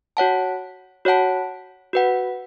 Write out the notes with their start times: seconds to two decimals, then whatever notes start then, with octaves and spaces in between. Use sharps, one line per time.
0.17 F#4 C#5 F#5 A5
1.05 F#4 C#5 F#5 A5
1.93 F#4 B4 F#5